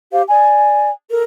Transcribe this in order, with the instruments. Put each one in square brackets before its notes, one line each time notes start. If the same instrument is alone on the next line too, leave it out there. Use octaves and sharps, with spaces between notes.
[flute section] G4 C5 F5
D5 G#5
A4 A#4